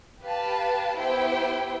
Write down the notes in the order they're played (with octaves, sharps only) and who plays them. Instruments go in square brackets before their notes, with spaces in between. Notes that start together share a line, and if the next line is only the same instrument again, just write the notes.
[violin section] G4 B4 F5 A5
B3 E4 G4 C5 G5